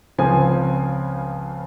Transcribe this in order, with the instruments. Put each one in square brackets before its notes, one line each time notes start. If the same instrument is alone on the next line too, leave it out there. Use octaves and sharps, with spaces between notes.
[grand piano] C#2 C#3 F3 C4 G#5